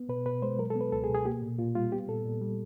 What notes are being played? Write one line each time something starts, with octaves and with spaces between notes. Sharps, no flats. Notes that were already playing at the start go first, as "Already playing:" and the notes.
Already playing: B3
B2 B4
B2 B4
G#3 C5
F#3 A#4
A4
B3
B4
C#2 A4
G#4
B2
G#4
A#3 G4
A#2
A#2 F4
G3 F4
B3 G4
A#2 A4
A#2
G3